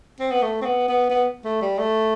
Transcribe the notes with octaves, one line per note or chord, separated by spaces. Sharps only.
C4
B3
A3
C4
B3
B3
B3
A3
G3
A3